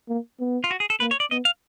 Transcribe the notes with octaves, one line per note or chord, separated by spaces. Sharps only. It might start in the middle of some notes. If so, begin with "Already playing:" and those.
A#3
B3
F4
F#4
G#4
A4
A#3 B4
C#5
D5
B3 D#5
F5